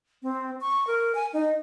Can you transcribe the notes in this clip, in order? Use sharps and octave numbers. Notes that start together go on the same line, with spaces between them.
C4
C#6
A#4
G#5
D#4